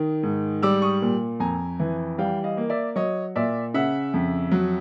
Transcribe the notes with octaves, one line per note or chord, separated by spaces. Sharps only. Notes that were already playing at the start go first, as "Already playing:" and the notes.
Already playing: D#3
G#2
G3 D6 E6
C#6 D#6
A#2
F2 G#5 A#5
E3
G3 F5 G5
D#5 F5
A#3
D5 E5
F#3 C#5 D#5
A#2 D5 E5
C#3 E5 F#5
F2
F#3